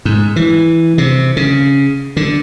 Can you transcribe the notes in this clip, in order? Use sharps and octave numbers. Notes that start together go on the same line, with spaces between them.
G#2
E3
C3
C#3
D3